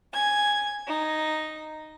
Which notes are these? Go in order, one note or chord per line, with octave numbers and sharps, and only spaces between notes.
G#5 G#6
D#4